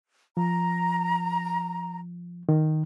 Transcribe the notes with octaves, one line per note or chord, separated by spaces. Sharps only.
F3 A#5
D#3